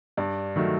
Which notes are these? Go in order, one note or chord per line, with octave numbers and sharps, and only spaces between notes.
G2 D5
D#3 F#3 A3